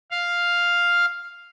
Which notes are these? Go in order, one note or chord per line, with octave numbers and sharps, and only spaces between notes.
F5